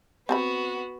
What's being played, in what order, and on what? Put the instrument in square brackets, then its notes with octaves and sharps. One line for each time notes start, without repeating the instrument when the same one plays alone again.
[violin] B3 F#4 [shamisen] C4 G#5 B5